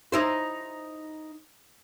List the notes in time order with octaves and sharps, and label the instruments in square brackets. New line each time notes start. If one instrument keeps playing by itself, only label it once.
[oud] D#4 E4 C5